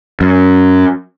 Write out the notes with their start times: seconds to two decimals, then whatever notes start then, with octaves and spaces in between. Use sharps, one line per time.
0.21 F#2